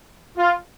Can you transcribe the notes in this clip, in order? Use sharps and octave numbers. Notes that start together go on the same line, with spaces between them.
F4